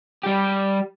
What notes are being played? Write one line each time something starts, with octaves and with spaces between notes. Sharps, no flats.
G3 G4